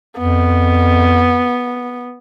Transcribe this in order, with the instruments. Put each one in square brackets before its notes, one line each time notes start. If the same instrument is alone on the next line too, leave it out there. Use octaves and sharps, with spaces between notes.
[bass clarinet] F2 [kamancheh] B3